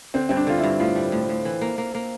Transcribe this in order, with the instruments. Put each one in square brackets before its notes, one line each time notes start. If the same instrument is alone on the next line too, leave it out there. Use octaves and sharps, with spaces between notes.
[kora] D3 [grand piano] C4
[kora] G2 [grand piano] C4
[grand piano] D4
[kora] D3 [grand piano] F4
[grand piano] E4
[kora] G2
[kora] A2 [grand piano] F4
[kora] G3
A2
A2
E3
A#3
A#3
A#3